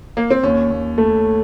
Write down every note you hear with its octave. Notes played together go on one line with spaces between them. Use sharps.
A#3
C4
D#2 C#4
D#2
A3